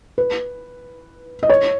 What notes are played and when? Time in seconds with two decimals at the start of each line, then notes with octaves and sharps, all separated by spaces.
0.18 B4
1.43 D#5
1.49 C#5